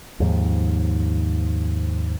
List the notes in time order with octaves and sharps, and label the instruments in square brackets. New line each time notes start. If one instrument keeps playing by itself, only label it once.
[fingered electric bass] D#2 G#2 F3